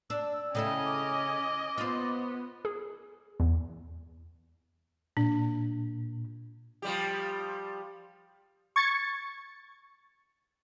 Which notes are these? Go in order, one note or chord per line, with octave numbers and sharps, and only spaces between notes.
D4 E6
C#3 A3 C#4 E4 D#5 G5
D6
B3 F4 C5
G#4
E2
A#2 D4
F3 G3 G4
C#6 G#6 A6 C#7